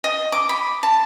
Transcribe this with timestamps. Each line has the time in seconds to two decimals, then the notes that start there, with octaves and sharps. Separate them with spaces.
0.04 D#5
0.32 D6
0.49 B5
0.83 A5